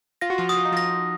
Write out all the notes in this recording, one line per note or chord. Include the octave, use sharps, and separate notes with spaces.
F4 A#6
F#4
F3 F4
F#4 D#6
F4
D#4
F3 F4 A#6